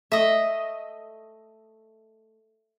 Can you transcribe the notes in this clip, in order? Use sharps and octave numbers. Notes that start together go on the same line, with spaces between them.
A3 D#5 E5